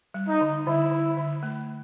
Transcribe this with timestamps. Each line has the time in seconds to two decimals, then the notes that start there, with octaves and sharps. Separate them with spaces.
0.14 G3
0.28 D#4
0.41 D3
0.66 D3 E4
0.92 D3
1.17 D3
1.43 A3